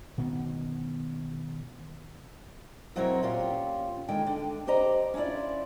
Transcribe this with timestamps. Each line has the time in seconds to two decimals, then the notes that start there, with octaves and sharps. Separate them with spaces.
0.18 B2 D#3 B3
2.96 B2 F#3 C4 E4 A#4 C#5
3.23 A#2 C#4 F4 G4
4.08 D3 D#3 G#3 G5
4.27 D3
4.67 G4 C5 D5 D#5 A#5
5.14 C#4 D4 E4 F4 D5